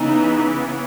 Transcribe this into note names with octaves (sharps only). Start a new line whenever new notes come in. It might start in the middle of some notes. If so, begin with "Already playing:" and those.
Already playing: C#3 E3 B3 D#4